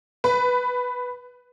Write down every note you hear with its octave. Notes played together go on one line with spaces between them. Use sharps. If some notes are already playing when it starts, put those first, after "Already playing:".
B4